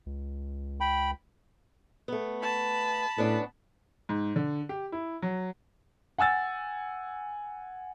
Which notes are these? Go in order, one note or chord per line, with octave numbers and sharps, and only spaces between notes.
C#2
G5 B5
A3 B3
A5 B5
A2 B3 C#4 D4
G#2
D3
G4
E4
F#3
F#5 G#5 E6 A6